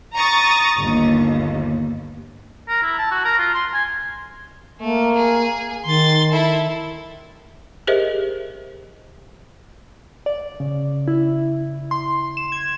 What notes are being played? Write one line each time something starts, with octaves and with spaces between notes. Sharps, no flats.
A#5 C#6 D#6 A6
G1 D#2
A#4
E4
A5
F#4
A#4
F4
C6
G#5
A3 A#3
G#4
D#3 C6 A6
E4 A4
G4 G#4 A#4 C5 D#5 E5
D5
C#3
E4
C6
E7
G#6